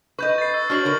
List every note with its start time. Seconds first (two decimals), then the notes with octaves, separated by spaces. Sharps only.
0.19 B4 D#5 C#6 G6
0.38 A6 C7
0.54 E6
0.70 D4 F#4 C#5 F6 C7 F#7
0.84 D3 A#4